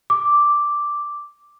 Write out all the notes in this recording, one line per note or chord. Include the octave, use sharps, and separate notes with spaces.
D6